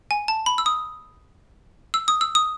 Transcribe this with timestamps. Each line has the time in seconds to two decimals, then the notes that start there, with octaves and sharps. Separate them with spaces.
0.11 G#5
0.28 A5
0.46 B5
0.58 E6
0.66 D#6
1.94 E6
2.08 D#6
2.21 E6
2.35 D#6